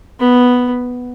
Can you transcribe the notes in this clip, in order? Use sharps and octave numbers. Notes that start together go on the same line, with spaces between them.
B3